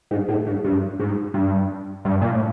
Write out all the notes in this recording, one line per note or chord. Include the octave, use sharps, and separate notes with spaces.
G#2
A2
G#2
G2
G#2
G2
G2
A#2
A2